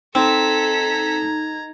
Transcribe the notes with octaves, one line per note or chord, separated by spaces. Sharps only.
C4 D#4 A4 A#5 G#6 B6